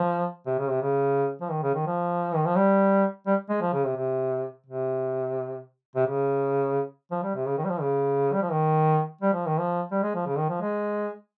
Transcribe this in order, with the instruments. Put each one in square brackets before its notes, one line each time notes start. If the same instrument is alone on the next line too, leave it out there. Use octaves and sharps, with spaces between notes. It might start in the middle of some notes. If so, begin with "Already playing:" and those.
Already playing: [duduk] F3
C3
C#3
C3
C#3
F3
D#3
C#3
D#3
F3
D#3
F3
G3
G3
G#3
F3
C#3
C3
C3
C3
C3
C#3
F3
G3
C3
C#3
D#3
G3
F3
C#3
G3
F3
D#3
G3
F3
D#3
F3
G3
G#3
F3
C#3
D#3
F3
G#3